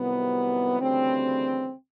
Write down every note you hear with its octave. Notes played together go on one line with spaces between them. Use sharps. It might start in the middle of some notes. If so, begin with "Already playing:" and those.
Already playing: C2 C3 D#3 F#3 B3
D2 C#3 E3 G3 C4